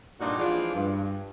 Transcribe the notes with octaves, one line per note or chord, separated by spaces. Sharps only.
G2 A#2 D#4 F4 F#4 D5
E3 F3 G#3 D4 F4
G2